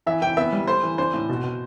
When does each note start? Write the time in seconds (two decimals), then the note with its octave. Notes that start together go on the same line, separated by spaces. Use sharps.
0.06 E3 E5
0.21 E3 G5
0.37 B3 E5
0.53 G3
0.67 A3 C5
0.83 E3
0.98 D4 C5
1.14 A2
1.29 B2
1.44 B2